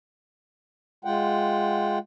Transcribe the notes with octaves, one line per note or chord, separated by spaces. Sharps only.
G#3 F4 F#5 G5